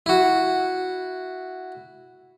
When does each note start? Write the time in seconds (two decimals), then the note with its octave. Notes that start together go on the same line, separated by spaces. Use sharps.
0.06 E4 F#4